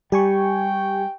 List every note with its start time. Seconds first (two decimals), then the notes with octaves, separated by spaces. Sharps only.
0.12 G3 G4 G5 G#5 C#6